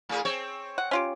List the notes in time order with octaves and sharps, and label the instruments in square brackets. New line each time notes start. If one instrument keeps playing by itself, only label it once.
[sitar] A2 G#4
C4 C#5
[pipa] F#5
C#4 F4 G4